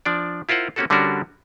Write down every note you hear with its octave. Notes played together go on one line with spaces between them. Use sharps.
F3 D4 D5
E4 F4 A#4 C5 F#5
A#3 C4 C#4 F#4 G4 A4
D3 G3 C#4 D4 F#4 A#4